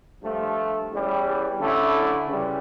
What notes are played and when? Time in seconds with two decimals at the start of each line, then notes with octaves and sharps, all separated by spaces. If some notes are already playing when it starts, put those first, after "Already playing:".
0.22 G2 F3 A3
0.90 E2 E3 G3 C#4
1.60 D3 A3 C#4 E4
2.27 C#3 E3 G3